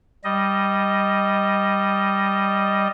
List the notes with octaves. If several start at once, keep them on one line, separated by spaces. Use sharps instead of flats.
G3 D#5